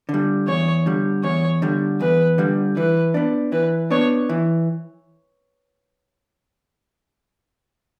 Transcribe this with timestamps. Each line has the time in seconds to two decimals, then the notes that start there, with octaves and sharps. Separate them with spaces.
0.09 D3
0.14 G3
0.48 E2 C#5
0.86 D3 G3
1.24 E2 C#5
1.62 D3 G3
2.00 E2 B4
2.38 D3 G3
2.76 E3 B4
3.14 B3 D4
3.52 E3 B4
3.90 B3 D4 C#5
4.29 E3